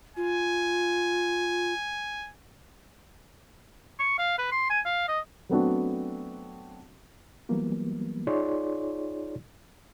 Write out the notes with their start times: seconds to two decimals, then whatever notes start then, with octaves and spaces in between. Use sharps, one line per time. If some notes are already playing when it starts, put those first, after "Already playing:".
0.17 F4 G#5
3.99 C#6
4.18 F5
4.38 B4
4.52 C6
4.70 G#5
4.85 F5
5.08 D#5
5.49 F#3 A3 B3 C4 D4 F#4
7.49 E3 F#3 G3 A#3 B3
8.27 D#4 F4 G#4 C#5 D5 C6